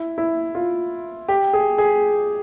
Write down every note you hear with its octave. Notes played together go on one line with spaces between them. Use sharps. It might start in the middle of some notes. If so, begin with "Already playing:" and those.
Already playing: E4
E4
F4
G4
G#4
G#4